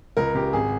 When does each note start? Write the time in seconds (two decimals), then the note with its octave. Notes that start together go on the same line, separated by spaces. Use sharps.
0.17 C#2 A#4
0.35 C#3 G4
0.53 G#1 G#4